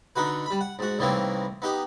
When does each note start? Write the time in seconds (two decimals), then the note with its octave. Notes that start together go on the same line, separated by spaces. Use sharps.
0.16 D3 D#4 F#4 B4
0.46 G3 B5
0.61 F#5
0.79 G#2 F#4
0.99 C2 A2 D#3 E3 A#3 C4
1.62 B3 D#4 G4